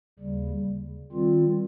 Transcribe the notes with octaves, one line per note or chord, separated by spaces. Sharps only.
D#2 C#3 G3
D#3 G3 C4 F4